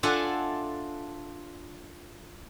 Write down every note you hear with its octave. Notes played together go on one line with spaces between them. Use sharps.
D4 F4 A4 E5 F#5 G#5